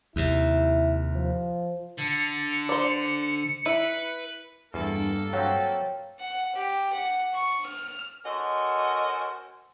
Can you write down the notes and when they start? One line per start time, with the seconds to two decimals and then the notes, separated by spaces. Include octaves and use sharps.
0.16 D#2 C3 E4
1.14 F3
1.99 D3 C#7
2.69 C5 D5
3.66 E4 B4
4.74 E2 G2 A#3 A4
5.33 F#3 C4 C#5 F5 G5
6.20 F#5
6.55 G4
6.93 F#5
7.34 C#6
7.66 F6
8.25 C#4 F#4 A4 A#4 C5 D#5